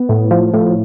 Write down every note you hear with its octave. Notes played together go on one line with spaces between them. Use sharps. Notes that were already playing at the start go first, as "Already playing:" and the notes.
Already playing: B3
A2
F3
A2